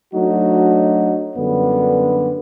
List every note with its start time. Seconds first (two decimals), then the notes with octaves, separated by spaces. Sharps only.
0.14 F#3 A3 D4 D#4 F#4
1.37 F#2 D3 G3 B3